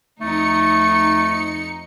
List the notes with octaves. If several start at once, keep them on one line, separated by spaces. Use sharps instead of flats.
F2 A3 D#4 C#7